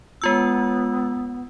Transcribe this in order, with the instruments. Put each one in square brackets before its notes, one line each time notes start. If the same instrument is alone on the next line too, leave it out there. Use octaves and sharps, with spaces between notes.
[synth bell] G#3 F4 E6 [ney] B3